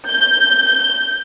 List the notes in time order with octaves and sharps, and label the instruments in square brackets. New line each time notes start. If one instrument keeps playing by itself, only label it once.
[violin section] G6